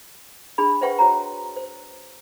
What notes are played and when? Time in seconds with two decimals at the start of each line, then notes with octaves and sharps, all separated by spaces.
0.58 D4 G#4 B5
0.81 B4 C5 E5 F#5 G5 C#6
0.99 F#4 C5 C#5 F#5 A#5
1.56 C5